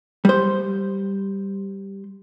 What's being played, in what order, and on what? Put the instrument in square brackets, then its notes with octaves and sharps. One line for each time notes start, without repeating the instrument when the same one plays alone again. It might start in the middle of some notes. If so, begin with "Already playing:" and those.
[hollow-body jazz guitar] G3 C5